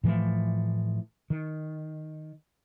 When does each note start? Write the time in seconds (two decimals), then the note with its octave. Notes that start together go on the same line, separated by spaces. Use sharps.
0.04 A2 E3 F3 A3
1.30 D#3